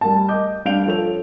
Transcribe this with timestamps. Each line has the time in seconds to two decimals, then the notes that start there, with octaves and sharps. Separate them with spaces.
0.01 G3 A#4 A5
0.29 D#5 D6 G6
0.65 G3 D4 F5 G6 D7 F7
0.86 F3 A4 C#5 F7